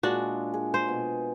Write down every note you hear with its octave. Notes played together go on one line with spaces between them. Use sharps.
A#2 G#3 D4 F#4
G#4
C5
B2